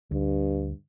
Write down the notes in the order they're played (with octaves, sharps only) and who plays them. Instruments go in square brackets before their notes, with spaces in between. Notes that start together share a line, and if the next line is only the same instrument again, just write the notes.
[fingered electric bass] D2 [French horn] G2